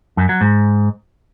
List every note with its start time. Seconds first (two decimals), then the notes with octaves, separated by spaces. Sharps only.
0.17 F#2
0.29 F#3
0.41 G#2